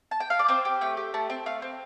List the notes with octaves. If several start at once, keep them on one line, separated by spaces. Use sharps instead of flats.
A5
G5
F5
D5
C4 C5
G4
A3 G5
G4
A3 A5
C4 G5
A3 F5
C4